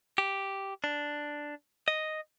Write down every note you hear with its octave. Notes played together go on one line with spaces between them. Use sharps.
G4
D4
D#5